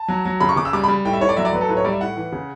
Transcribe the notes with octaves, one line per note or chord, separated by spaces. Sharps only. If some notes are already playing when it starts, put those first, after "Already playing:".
Already playing: A5
F#3
F#3
C#3 B5
C#6
C#3 D6
E6
G3 D6
B5
G3
A2 G5
E5
A2 C#5
D5
F#3 E5
D5
F#3 B4
A4
A2 B4
C#5
G3 D5
E5
A2 F#5
E3
C#3